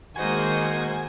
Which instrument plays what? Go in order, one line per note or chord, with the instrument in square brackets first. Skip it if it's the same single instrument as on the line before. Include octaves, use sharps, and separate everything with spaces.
[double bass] D#3 G#3 [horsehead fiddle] A#3 C5 [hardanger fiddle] F#4 D#5 [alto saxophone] G#5